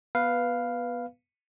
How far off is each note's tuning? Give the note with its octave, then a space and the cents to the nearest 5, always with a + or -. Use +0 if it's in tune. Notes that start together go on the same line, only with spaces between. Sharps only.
B3 -10 B4 +0 F5 +0